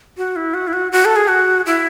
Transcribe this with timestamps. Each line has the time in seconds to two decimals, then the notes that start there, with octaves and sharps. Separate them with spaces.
0.17 F#4
0.36 E4
0.54 F#4
0.68 E4
0.73 F#4
0.92 F#4
1.05 A4
1.16 G#4
1.28 F#4
1.66 E4